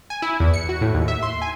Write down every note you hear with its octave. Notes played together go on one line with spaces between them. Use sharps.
G#5
E4
E2
C#7
F#4
A2
D#2
E5
C6
G#5